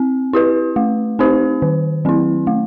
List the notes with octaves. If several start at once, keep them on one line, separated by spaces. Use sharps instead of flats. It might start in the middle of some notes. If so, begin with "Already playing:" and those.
Already playing: C4
E4 G4 B4
A3
C4 D#4 G4 C5
D#3
F#3 C4 E4
A3